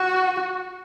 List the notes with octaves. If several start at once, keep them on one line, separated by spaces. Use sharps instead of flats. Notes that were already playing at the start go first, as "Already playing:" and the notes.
Already playing: F#4